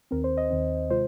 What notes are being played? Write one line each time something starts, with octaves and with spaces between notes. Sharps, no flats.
D#2 D#3 C4 A#4
C5
D#5
D#2 D#3 C4
C3 G#3 F4 C5